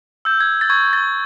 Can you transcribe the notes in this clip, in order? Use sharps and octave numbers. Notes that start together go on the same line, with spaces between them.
E6 G6
G#6
A6
C#6 G#6
A6